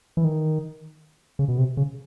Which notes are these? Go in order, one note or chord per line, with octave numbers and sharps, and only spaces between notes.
E3
D#3
C#3
B2
C3
C#3